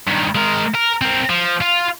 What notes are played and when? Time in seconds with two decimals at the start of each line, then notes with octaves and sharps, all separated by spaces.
0.07 G2 D#3
0.35 G#3 A#4
0.75 A#4
1.01 C4 A#4
1.30 F3
1.61 F4